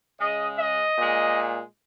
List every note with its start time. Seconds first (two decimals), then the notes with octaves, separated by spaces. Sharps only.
0.19 C#3 G#3 D#5
0.58 D#5
0.98 A#2 G#3